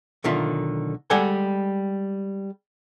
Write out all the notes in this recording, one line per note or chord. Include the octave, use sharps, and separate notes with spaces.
B1 D3 D#3 F4 E5
G3 G#3 G4 A4 F#5 G#5